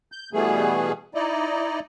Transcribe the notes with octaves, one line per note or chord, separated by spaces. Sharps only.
G6
B2 E3 G3 A3 B3 G#4
D#4 E4 D5 D#5